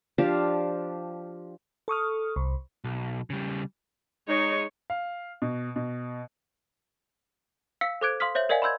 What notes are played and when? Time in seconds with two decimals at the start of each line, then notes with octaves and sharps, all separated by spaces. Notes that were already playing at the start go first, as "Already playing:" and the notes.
0.18 F3 D4 G4 F5
1.88 A4 C#6 D#6 F6
2.36 C2
2.84 B1
3.30 C#3 G3
4.28 G#3 D#4 C#5
4.90 F5
5.42 B2
5.76 B2
7.81 F5 E6 B6 C#7
8.01 A4 C5 D6 F#6 G#6 D7
8.20 F5 C6 D#6 F6 B6
8.35 C5 C#5 E5 G6 F#7
8.49 A#4 D5 D#5 F5 F#5 G#5
8.62 B5 C6 E6 G6 G#6